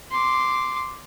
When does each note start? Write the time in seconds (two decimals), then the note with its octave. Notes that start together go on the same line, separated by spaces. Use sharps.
0.11 C6 D6